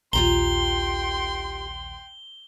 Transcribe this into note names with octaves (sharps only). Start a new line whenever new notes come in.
A#1 D#2 F4 G4 G5 A#5 C6 G7